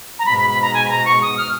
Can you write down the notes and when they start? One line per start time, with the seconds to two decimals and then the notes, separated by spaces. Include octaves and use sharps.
0.19 A#5
0.25 G#2 B2 B5
0.38 B5
0.50 B5
0.62 A#5
0.74 G#5
0.86 B5
0.89 A#5
1.05 C#6
1.22 D#6
1.37 F6